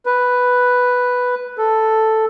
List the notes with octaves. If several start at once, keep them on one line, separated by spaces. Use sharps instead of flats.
B4
A4